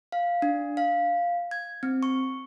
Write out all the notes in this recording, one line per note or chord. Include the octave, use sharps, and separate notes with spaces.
F5
D4
F5
G#6
C4
C#6